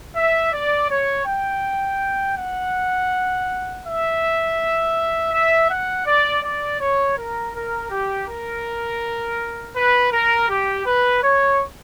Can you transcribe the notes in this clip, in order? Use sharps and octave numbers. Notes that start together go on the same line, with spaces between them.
E5
D5
C#5
G5
F#5
E5
E5
F#5
D5
D5
C#5
A#4
A#4
G4
A#4
B4
A#4
G4
B4
C#5